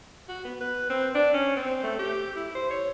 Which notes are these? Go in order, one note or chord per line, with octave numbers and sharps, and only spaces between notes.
F#4
B3
B4
C4
D4
C#4
C4
A3
G4
E4
C5
C#5